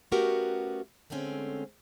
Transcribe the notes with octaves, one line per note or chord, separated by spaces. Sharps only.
A3 B3 C#4 F#4 G4 A#4
D3 G#3 A3 C4 C#4